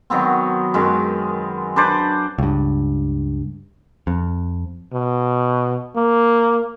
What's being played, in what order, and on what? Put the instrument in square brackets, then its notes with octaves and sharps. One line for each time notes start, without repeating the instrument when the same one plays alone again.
[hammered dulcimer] D#3 F#3 B3 C4
F#2 D#3 G#3
D4 B4 C5 D5
[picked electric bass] C#2 G2
F2
[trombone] B2
A#3